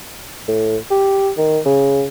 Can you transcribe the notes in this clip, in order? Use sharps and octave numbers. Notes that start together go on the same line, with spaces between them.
A2
G4
D#3
C#3